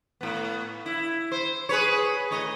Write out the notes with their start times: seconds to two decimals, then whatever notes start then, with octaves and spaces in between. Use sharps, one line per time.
0.21 A2 B3
0.86 E4
1.32 C5
1.69 G#4 B4 C#5
2.31 A2 C#5 D#5